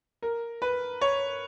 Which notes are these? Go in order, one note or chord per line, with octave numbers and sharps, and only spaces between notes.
A#4
B4
C#5